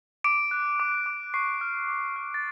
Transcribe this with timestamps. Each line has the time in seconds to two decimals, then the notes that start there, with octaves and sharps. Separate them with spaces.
0.24 D6 D7
0.51 F#6
0.80 D6
1.06 D6
1.34 C#6 C7
1.61 F6
1.88 D6
2.16 F6
2.34 A6